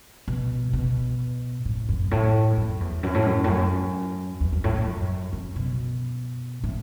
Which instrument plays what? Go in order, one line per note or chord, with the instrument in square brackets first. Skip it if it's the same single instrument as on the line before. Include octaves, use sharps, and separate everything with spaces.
[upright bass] B2
B2
A2
F#2
A2
F#2
E2
F#2
A2
F#2
A2
F#2
E2
F#2
A2
A2
F#2
F#2
B2
A2